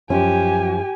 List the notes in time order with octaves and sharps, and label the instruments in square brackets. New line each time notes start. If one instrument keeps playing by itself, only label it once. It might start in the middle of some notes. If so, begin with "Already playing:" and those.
[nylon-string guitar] F#2 F3 C#4 [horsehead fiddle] G4 G#5